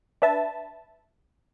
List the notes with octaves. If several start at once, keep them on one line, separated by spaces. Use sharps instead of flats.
D4 B4 E5 A5